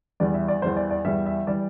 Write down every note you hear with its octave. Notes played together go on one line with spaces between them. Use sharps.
E2 E3 G3 D5
E5
D5
E2 E3 G3 C5
D5
D5
E2 E3 G3 E5
E5
E3 G3 D5